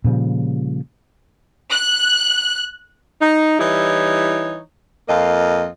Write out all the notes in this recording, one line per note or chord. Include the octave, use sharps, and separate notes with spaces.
A#2 C#3 F3 G3
F#6
D#4
E3 G3 D#4 E4 C#5
F2 A#3 F4 D#5